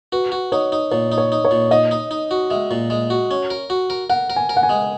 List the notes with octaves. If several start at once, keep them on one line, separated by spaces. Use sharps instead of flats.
F#4 B4
F#4
D#4 C#5
D#4
A#2 C#5
D#4
C#5
D#4
C#5
A#2
D#4 D#5
D#4
D#4
F#4
G#3 E5
A#2
G#3
F#4
C#4
A#4
F#4
A#4
A#4 F#5
A#4
G#5
A#4
F#5
G#5
G#3